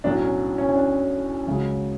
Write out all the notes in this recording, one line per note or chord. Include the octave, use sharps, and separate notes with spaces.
B1 A2 F#3 D4
C#4
C#4
C#4
D4
C#2 C#3 F#3